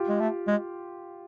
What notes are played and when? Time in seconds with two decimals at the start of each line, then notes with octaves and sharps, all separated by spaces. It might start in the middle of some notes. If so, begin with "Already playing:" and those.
Already playing: F4 G4
0.08 G#3
0.20 A3
0.47 G#3